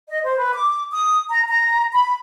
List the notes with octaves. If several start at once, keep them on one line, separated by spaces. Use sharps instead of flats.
D#5
C5
B4
D6
D#6
A#5
A#5
B5